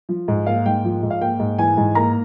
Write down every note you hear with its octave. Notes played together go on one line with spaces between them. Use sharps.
F3
G#2
A#3 F5
G#2 G5
F3
G#2
F5
A#3 G5
G#2
E3 G#5
G#2
A#3 A#5